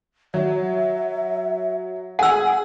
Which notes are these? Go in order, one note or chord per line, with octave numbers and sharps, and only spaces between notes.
F#3 E5
G#4 F#5 G#5 E6